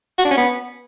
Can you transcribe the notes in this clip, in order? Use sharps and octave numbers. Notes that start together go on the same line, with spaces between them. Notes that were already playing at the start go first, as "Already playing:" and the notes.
F#4
D4
C#4
B3